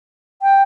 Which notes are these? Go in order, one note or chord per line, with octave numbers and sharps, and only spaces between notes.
G5